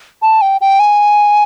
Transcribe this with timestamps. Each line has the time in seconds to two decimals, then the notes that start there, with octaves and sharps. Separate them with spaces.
0.22 A5
0.41 G5
0.61 G5
0.80 G#5